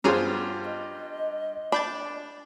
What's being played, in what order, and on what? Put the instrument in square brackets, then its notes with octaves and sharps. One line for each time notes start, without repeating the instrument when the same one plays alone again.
[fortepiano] G2 F4 C5 [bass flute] B3 [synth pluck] G#4 C#5 A#5
[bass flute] D#5
[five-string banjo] D4 [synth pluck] B5 G6 A6